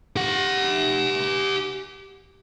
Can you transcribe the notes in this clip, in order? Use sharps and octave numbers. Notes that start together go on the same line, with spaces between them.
G4 F#5